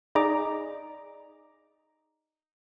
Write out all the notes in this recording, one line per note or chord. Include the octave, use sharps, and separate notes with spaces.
D#4 G#4 D5 D#5 A#5 D6